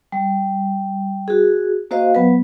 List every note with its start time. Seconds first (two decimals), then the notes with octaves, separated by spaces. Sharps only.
0.12 G3
1.28 F#4 G#4
1.91 A#3 F#4 C5 D#5 F5
2.15 F#3 B3 B4